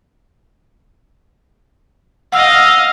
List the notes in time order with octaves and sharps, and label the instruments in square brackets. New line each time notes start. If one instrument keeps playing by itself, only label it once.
[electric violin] D#5 F5 [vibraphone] F#5 E6